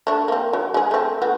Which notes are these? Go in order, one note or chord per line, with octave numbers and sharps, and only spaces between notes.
A3 D4
A#3 C4
F#3
G#3 G#4
A3 C4
A3 B3 F#4